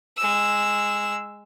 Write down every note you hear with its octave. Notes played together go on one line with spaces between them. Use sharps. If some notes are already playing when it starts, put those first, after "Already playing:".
G#3 E6